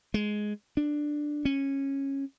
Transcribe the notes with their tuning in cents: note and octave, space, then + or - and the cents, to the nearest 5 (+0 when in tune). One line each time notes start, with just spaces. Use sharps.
G#3 +10
D4 +10
C#4 -15